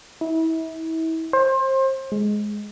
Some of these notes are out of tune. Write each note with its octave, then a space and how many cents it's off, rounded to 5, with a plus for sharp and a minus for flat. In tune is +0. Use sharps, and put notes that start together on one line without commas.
E4 -35
C5 +30
G#3 +10